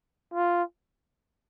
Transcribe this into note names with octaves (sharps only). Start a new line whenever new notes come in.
F4